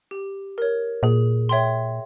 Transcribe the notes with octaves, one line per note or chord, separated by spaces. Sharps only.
G4
A#4 C#5
A#2 G#4
C#5 E5 G5 C6